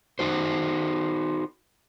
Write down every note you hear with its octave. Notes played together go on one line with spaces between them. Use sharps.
D#4 F#4 C5